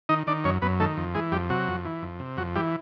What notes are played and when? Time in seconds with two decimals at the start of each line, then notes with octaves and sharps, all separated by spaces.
0.09 D#3 D#4 D#5
0.27 D#3 D4 D5
0.44 F#2 C#4 C#5
0.62 F#2 B3 B4
0.80 D#3 A3 A4
0.97 F2
1.15 E3 G#3 G#4
1.32 F2 G3 G4
1.50 C3 F#3 F#4
1.68 F2
1.85 E3
2.02 F2
2.19 C3
2.37 F2 F#3 F#4
2.55 E3 G3 G4